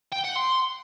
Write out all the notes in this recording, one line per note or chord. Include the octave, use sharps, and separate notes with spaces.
G5
F#5
C6